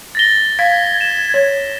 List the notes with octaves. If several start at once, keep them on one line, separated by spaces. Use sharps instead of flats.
A6 A#6 G7
F5 G#6 B6
E7
C#5